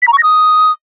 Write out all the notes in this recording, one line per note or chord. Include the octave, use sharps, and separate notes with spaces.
B6
A#5
C#6
A#6
D#6